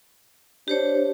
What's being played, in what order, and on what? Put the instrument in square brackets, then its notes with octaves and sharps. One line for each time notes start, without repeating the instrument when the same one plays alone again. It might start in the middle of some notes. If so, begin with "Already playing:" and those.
[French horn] D4 [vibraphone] G4 C5 C#5